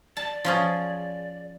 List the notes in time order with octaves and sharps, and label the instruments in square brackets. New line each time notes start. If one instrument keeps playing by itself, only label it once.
[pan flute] D5 [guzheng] A5
[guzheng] F3 C#4 G#4